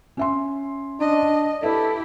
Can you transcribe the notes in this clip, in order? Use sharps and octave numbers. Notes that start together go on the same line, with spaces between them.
C#4 E5 C6
D4 D#5
E4 G4 A4 B4 E5